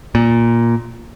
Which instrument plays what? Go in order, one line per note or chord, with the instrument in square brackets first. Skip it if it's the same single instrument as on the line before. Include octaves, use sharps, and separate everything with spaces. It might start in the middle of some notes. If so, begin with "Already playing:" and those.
[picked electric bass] A#2